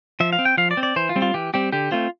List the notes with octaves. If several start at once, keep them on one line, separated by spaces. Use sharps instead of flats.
F3 E5
F5
C4
G5
F3 F5
D5
C4
D5
E3 C5
F4
G3 C4
F4
E3 G4
G3 C4 G4
D3 G4
A3 C4 F4